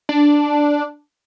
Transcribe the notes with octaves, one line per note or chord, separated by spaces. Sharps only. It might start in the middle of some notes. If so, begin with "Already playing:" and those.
D4